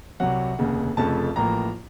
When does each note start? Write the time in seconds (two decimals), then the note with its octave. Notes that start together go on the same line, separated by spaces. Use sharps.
0.20 C2 C3 F#3 F#5
0.59 F1 D#2 C#3
0.97 F1 F2 C#3 F3 A3 A5
1.36 A1 A2 F3 A#3 A#5